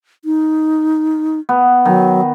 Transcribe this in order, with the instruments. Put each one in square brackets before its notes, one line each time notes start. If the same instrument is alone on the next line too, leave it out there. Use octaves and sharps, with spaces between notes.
[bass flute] D#4
[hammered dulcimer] B3
[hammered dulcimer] D#3 [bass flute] F#3